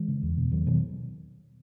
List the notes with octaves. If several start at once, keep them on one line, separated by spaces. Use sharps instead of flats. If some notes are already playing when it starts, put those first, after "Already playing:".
Already playing: E3 G#3
C#3
E2
B2
E2 D#3 F#3
B2 D#3 F#3